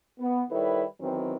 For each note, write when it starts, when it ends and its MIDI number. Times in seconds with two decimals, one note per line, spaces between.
0.19 0.42 59
0.50 0.82 51
0.50 0.82 55
0.50 0.82 64
0.50 0.82 69
0.50 0.82 71
0.50 0.82 73
1.00 1.34 40
1.00 1.34 51
1.00 1.34 52
1.00 1.34 54
1.00 1.34 60